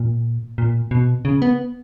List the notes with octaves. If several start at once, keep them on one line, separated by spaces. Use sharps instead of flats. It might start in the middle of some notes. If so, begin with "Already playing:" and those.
Already playing: A#2
A#2
B2
C#3
B3